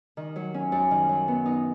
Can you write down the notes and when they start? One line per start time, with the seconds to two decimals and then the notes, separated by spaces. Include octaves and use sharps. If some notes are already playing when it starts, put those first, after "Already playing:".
0.17 D#3
0.36 F#3
0.54 C#4
0.72 F#2
0.91 D#3
1.09 F#3
1.28 B3
1.46 D#4